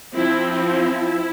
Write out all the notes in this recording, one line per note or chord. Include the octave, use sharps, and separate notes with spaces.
F3 C4 E4
E4